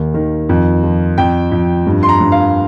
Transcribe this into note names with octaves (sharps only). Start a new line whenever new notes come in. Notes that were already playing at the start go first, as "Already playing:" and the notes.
Already playing: D#2 D#3
D#3
F2
F3
F2 G5
F2
G2
C6
A#5
G2
F5